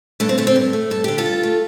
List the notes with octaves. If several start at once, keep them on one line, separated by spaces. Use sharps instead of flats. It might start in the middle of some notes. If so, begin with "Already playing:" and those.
G2 A3 D4
C4
D3 A3
C4
G2
A3
G2 A4
D3 G4
F4 A4
G2
A3